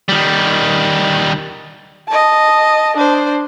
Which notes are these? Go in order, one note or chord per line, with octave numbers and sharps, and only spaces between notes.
D#3 G3
D#5 A5
D4 C5